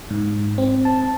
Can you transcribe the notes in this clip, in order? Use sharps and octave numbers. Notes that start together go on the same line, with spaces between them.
G#2
C4
A5